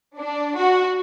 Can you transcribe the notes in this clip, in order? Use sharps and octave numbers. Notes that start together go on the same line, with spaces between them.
D4
F#4